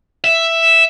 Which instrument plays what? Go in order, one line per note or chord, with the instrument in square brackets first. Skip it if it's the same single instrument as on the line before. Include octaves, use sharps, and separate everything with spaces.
[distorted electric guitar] E5